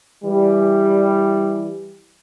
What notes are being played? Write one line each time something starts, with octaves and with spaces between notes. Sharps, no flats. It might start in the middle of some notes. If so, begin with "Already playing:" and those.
E3 G3